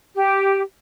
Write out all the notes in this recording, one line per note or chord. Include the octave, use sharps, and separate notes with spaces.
G4